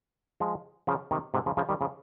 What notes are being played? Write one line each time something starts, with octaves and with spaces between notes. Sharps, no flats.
F3 G#3
C#3 F3
C3 D#3
G#2 C3
C#3 F3
C#3 F3
D#3 G3
C#3 F3